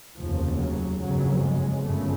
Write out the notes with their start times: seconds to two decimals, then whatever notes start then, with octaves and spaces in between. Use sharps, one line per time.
0.18 F1 D#2 C#3 F3
0.59 F#3
1.01 G1 F2 C#3 F#3
1.43 G#3
1.84 G1 F#2 C#3 A3